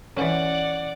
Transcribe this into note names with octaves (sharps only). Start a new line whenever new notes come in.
E3 C#4 D5 F#5